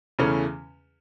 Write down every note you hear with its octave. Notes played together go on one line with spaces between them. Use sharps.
E2 C#3 E3 A3 C#4